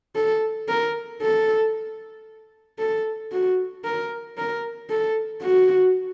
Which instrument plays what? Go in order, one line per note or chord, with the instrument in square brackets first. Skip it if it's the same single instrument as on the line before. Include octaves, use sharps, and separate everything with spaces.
[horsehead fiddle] A4
A#4
A4
A4
F#4
A#4
A#4
A4
F#4